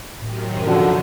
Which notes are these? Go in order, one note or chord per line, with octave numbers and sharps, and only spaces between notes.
F#2 A2 C3 D#3
D3 F3 F#4 F#5